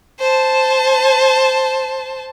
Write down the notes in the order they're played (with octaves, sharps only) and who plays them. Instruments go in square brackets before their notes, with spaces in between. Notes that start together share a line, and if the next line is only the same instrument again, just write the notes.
[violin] C5 A5